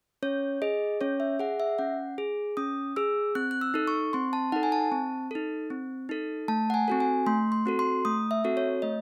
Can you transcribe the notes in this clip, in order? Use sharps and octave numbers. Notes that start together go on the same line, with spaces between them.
C#4 C#5
G#4 D#5
C#4 C#5
E5
G#4 F#5
E5
C#4 F#5
G#4
C#4 D#6
G#4 E6
C4 F#6
F#6
E6
D#4 A4
C#6
C4 C6
A5
D#4 A4 F#5
G#5
A5
C4
D#4 A4
C4
D#4 A4
A3 A5
F#5
G#5
C4 F#4 A4
G#5
A3 C6
C6
C4 F#4 A4
C6
A3 D#6
E5
C4 F#4 A4
C#5
A3 D#5